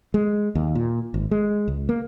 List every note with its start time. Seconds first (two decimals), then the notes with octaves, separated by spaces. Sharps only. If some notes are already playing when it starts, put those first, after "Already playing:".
0.14 G#3
0.55 D#2
0.75 A#2
1.14 G#1
1.31 G#3
1.68 C#2
1.89 A#3